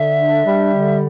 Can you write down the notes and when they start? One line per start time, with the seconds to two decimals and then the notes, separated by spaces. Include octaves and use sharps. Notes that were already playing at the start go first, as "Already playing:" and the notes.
Already playing: D3 E5
0.19 D4
0.45 G3
0.74 D3